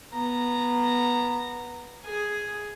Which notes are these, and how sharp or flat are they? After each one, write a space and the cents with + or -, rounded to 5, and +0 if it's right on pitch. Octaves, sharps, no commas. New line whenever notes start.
B3 -15 A#5 -15
G#4 +0 G#5 +5